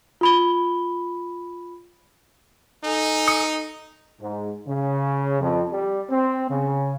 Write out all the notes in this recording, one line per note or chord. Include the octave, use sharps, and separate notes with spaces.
F4 B5 G7
D#4 A4 G#5
D#6 C#7
G#2
C#3
F2
G3
C4
C#3